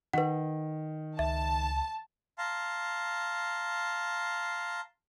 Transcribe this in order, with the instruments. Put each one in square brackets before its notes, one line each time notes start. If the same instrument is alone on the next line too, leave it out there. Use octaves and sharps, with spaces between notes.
[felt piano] D#3 [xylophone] B4 F#5
[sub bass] C#2 [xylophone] E5 [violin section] A5
[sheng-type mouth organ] F5 A5 A#5 C6